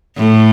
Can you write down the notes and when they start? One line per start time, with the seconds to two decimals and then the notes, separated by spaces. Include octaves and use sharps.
0.17 A2